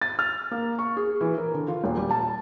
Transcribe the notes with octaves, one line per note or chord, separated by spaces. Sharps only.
A6
F6
A#3
C#6
G#4
E3
A#4
D3
F4
D#1
G3
A5